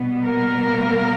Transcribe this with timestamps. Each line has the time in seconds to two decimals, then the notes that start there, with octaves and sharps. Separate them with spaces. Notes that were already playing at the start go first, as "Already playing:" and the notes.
Already playing: B2 G3 B3
0.24 A#3 A#4